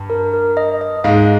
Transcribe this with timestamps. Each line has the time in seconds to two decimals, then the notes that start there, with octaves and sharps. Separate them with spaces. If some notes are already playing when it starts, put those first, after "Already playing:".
Already playing: G2
0.10 A#4
0.33 A#4
0.57 D#5
0.81 D#5
1.04 G#2 G#3 F5